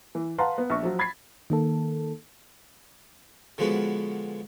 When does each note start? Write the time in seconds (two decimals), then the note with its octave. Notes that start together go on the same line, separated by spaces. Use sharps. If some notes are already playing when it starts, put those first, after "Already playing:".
0.15 E3
0.38 B4 F5 F#5 A5 A#5 C6
0.58 B3
0.70 A#1 C#6
0.83 F3 F#3
0.99 B5 G#6 A6 B6 C7
1.50 D#3 A#3 A4
3.58 D3 F3 G#3 B3 F#4 B4